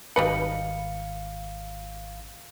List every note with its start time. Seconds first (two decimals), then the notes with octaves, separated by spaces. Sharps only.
0.16 G#1 G3 D#4 B4 F5 C#7